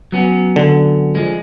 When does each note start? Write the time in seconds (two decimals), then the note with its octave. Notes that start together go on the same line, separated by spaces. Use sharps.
0.12 F#3 B3 C#4
0.56 D3
1.15 F3 G#3